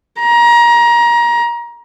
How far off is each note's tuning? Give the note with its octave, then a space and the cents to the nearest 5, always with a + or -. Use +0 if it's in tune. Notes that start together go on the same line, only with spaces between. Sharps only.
A#5 +25